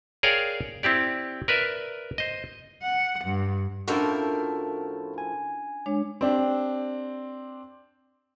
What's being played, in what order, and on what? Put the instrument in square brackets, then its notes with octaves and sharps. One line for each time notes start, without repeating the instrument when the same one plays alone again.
[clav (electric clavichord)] G#4 A#4 C#5 D5 F5 G5
C4 E4 G4 D5
A#4 B4 D5 E5
C5 D#5
[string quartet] F#5
G2
[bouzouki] A2 F3 A#4 [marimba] C#4 D4 [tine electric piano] F#4 A4 A5
[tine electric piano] G#5
[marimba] G#3 D4 C#5
[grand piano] C4 D4 G4